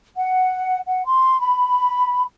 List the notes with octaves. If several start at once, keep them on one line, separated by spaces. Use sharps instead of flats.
F#5
F#5
C6
B5